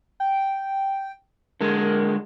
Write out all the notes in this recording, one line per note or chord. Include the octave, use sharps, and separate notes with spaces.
G5
D3 G#3 A#4